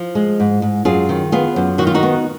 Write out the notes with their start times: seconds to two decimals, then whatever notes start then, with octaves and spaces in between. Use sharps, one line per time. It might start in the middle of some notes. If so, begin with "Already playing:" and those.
Already playing: F3
0.15 G#3
0.40 G#2
0.62 G#2
0.85 F#2 F4 G#4
1.09 D#3
1.32 B3 F4 G#4
1.56 F#2
1.78 D#3 F#4
1.87 F4
1.94 D#4 F#4
2.03 B3